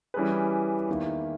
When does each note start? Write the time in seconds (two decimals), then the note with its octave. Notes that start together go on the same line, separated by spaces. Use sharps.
0.14 E3 G3 C#4 G#4 B4
0.88 E2 D#3 A#3 E4